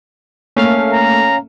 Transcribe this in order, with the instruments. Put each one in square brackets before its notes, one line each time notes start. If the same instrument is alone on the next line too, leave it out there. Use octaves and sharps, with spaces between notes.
[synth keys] A3 A#3 [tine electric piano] C#4 F5 F6
[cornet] A#5